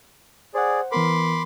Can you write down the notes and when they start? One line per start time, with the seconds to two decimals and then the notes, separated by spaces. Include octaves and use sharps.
0.54 G#4 C5 D5 F#5
0.92 E3 B3 A#4 B5 C6 D6